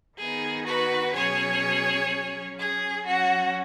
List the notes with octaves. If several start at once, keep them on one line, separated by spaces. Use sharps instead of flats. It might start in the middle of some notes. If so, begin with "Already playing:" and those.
D#3 B3 D#4 G#4
F#4 B4
B2 F#3 C#4 G#4 C#5
F#3 C#4
G#4
F#3 C#4 F#4